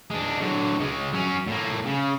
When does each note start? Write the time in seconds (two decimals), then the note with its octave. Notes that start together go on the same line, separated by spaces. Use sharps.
0.10 G#3 D4
0.40 D3 F#3
0.80 C#3 G#3
1.13 F#3 C#4
1.48 A2 A#3
1.86 C#3